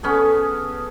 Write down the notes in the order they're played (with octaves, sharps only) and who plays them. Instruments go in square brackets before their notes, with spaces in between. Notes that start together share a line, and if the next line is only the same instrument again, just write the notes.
[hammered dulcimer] B3 C#4 G#4 A4